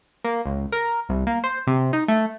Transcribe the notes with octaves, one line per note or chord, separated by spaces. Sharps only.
A#3
C#2
A#4
C2
A#3
C5
C3
D#4
A3